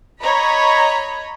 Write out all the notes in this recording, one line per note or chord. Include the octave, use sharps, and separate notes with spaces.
C#5 D#5 A#5 B5